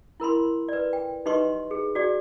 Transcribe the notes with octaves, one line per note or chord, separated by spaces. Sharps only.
E4 A#4 B5 C6
B4 D5
G5
D#4 G4 B4 D#5 C6 C#6
G#4
F#4 G#4 D5